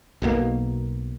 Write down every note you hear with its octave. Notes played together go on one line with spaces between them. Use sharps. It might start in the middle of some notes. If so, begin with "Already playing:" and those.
B1 B2 D3 A#3